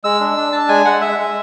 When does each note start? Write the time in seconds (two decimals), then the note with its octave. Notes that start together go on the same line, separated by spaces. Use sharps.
0.04 G#3 E6
0.20 D4
0.37 D4
0.52 D4 A5
0.69 G#3 G#5
0.85 G#3 F#5
1.01 G#3 E5
1.18 G#3